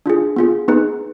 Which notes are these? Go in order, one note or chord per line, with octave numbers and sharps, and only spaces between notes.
D4 F4 G#4
B3 F4 G#4
B3 D#4 G#4 B4